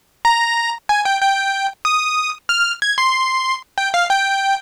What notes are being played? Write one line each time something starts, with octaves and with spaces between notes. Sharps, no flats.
A#5
G#5
G5
G5
D#6
F6
G#6
C6
G5
F5
G5